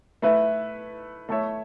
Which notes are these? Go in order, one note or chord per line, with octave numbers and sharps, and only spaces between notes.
A3 E4 B4 E5
A3 E4 A4 C#5 E5